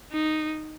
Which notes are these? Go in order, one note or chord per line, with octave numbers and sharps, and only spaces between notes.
D#4